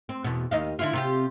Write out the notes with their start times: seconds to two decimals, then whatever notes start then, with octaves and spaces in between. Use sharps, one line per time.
0.09 C4
0.24 E2 B2
0.51 D#2 D#5 F5
0.79 D3 E4 F4
0.93 C3 F4 G4